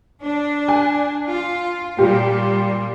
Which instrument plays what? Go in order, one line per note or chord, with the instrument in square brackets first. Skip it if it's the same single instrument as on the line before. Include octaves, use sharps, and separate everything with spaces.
[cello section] D4
[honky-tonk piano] G#5 F#6
[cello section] F4
[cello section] A#2 G3 [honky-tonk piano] F4 G4